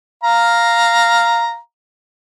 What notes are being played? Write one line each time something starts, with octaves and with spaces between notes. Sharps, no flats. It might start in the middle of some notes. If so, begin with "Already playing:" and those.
F5 A#5